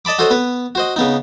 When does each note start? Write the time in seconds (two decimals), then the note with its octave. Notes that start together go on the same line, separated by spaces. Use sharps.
0.05 D5 D#5 A5 B5 D6
0.19 F#4 A4 C5 C#5 D#5
0.30 B3 B4
0.75 F#4 C5 D#5
0.96 C#3 B3 D#4